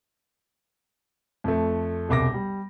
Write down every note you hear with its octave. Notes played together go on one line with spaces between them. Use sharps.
F2 A3
E1 C2 D6 A#6
G3